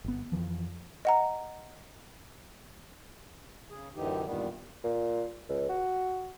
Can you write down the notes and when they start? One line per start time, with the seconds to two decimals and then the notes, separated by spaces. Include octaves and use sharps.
0.04 G1 B3
0.32 F2 C#3 E3 F3
1.05 D#5 F#5 A#5
3.70 C#3 G#4
3.95 F#2 A2 D3 E3 D#4 G4
4.25 E2 G2 A#2 D#3 G3 B3
4.84 A#2
5.49 C#2
5.69 F#4